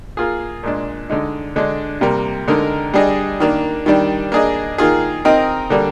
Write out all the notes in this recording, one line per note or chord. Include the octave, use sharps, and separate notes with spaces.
A#3 F4 G#4
A#2 G#3 D4
D3 G#3 D#4
D3 G#3 D4
C3 G3 A#3
D3 G#3 D#4 A#4
G3 D4 G#4 D#5
D#3 A#3 D4
D#3 G3 D4
A#3 D4 G#4 D#5
D#3 A#3 F4 G#4
C4 D#4 A#4 D#5
D3 G3 A#3 D4